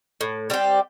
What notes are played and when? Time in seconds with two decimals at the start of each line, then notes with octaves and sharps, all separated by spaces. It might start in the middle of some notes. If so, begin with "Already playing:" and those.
0.21 A2
0.50 G3 C4 G4